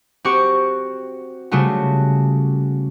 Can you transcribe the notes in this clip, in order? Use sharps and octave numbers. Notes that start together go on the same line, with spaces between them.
C4 F#4 G4 C#6
C#3 G3 A3 F4 F#4